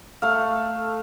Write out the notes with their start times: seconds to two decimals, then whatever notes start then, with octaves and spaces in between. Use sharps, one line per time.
0.22 A3 F5